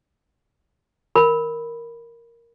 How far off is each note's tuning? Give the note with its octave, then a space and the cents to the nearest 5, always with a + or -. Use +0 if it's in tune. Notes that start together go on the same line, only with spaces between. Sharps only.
A#4 +0 B5 +0